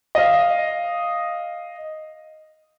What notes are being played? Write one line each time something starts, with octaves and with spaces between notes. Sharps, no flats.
D#5 F5